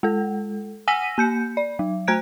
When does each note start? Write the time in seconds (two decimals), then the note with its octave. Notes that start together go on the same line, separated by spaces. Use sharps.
0.03 G#3 A4
0.88 F#5 G#5 E6 A#6 B6 D#7
1.18 A#3 G6 C#7
1.57 D5
1.79 F#3
2.07 A3 C5 A#5 F#6 G#6 D7